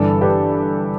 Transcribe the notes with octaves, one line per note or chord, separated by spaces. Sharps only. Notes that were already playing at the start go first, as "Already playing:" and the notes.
Already playing: G1 G2 E3 A4 D5
G4 B4